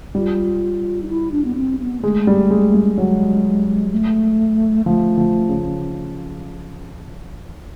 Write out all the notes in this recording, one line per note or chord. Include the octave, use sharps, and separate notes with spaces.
G3 F4
D#4
E4
D4
B3
C4
B3
G#3 A3
G3
G#3
G3
F#3 G#3
A3
F3 A3
F3
C#3